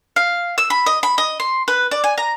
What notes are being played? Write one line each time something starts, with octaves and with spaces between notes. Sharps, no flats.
F5
E6
B5
D#5
B5
D#5
C6
B4
D5
G#5
A#5